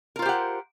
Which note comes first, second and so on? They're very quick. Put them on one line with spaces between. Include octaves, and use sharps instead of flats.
A#4 F4 C5 G4 F#5